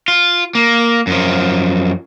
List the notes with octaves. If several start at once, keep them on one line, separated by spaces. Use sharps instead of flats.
F4
A#3
F#2 F3